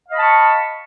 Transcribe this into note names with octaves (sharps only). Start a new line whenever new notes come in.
D#5 F5 A5 B5 C#6